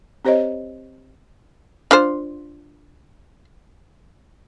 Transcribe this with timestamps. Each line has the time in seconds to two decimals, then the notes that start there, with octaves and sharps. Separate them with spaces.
0.25 C4 G4 C5 C#5 D#5
1.91 D4 F4 C5